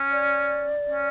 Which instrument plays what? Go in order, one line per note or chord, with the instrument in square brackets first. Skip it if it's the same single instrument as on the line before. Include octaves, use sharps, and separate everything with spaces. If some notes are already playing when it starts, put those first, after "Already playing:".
Already playing: [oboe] C#4
[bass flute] D5
[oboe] C#4